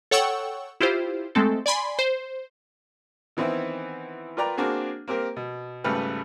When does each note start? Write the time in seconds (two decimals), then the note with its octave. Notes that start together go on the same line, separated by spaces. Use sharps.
0.11 A4 C#5 F#5 G5 C#6 E6
0.80 E4 F4 G4 C5
1.35 G#3 A3 C4 A4
1.66 D5 G#5 B5 C6
1.99 C5
3.37 D#3 E3 B3 C4 E4
4.37 F4 A#4 B4 D5 G5 A#5
4.57 A#3 C4 D4 F#4 G#4
5.08 A#3 C4 G4 A#4
5.37 B2
5.84 G#1 C#3 G3 A3 B4 F6